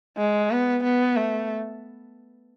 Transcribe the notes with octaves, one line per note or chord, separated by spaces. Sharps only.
G#3
B3
B3
A3